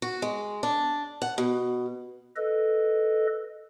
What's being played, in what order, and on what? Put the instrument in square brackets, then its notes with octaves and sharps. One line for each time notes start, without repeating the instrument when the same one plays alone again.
[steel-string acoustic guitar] F#4
G#3
D4
F#5
B2
[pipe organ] A4 B4 D#5